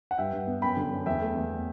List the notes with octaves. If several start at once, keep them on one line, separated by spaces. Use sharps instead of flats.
F#5
G2 E5 G5
G2
B3
F#2 G5 B5
D3
F#2
E2 E5 G5
A3
E2